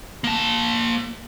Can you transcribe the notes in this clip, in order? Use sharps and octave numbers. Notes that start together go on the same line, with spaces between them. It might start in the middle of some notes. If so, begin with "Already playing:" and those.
A#3 A5